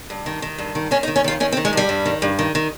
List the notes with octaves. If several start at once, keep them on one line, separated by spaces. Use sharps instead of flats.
G2
D#3
D#3
G2
D#3
D#3 C#4
D#4
D#3
C#4
D#3 F4
D#3 C#4
C4
D#3
G#3
G2 G3
G2
D#3
G2
D#3
D#3